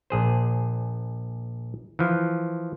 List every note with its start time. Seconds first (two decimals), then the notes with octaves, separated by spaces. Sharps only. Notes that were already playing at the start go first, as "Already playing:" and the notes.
0.10 A#1 G#4 C5
1.99 E3 F3